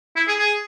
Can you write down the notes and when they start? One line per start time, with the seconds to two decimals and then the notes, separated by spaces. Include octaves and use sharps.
0.16 E4
0.28 G#4
0.39 G#4